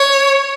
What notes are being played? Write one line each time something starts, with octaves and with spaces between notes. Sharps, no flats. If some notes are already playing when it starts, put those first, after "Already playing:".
Already playing: C#5